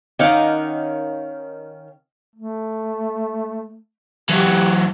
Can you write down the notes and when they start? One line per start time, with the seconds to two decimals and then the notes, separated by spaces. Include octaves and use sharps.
0.19 D#3 C#4 D#4 F5 F#5 D6
2.35 A3
4.30 E3 F#3 G4